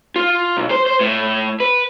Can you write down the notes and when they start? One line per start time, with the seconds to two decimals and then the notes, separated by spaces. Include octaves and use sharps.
0.16 F4
0.57 B1
0.71 C5
0.86 C5
1.01 A2
1.60 B4